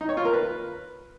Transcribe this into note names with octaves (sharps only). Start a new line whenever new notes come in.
D#4
C#5
F4
A#4
B4